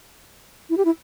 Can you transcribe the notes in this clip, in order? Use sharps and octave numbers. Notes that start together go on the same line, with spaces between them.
E4
G4
E4